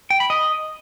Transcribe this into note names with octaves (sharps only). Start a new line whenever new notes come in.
G5
B5
D#5